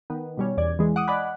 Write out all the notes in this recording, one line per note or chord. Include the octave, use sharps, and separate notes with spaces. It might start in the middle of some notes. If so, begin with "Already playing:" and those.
D#3 B3
B2 G3 C#4
E2 D5 G#6
E3 G#3
F#5 D6 D#6
D5 D#5 F#5 G#5 B5 F#6